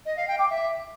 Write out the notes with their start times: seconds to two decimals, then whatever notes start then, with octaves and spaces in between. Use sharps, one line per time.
0.06 D#5
0.17 F5
0.28 G5
0.39 D6
0.50 E5